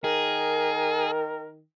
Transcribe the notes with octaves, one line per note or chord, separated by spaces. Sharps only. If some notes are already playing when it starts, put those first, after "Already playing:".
D#3 G#4 A#4